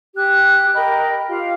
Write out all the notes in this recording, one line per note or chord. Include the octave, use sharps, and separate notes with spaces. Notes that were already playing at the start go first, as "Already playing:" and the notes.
G4 F#6
A#4 D#5 G5 B5
F4 G4 F5